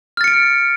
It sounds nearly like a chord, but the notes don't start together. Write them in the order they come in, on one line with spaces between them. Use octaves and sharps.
F6 A6 C#7 D7